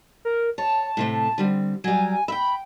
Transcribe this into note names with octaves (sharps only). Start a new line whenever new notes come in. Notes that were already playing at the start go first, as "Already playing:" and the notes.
A#4
C#5 A5
A2 C3 A3
D3 G3 C4
F#3 G3 G#5
E5 G5 B5